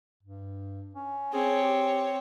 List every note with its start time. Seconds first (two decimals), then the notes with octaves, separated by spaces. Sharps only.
0.23 G2
0.95 C#4
1.33 C4 G#4 C#5
1.64 G4